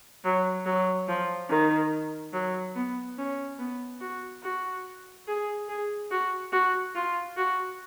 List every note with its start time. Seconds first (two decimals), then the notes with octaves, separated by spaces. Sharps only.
0.24 F#3
0.65 F#3
1.08 F3
1.49 D#3
2.33 F#3
2.75 B3
3.18 C#4
3.59 B3
4.01 F#4
4.43 F#4
5.27 G#4
5.69 G#4
6.11 F#4
6.52 F#4
6.95 F4
7.37 F#4